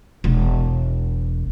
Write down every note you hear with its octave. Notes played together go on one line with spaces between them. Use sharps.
E1